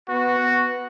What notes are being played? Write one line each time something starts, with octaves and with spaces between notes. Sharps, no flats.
B3 F#4
B3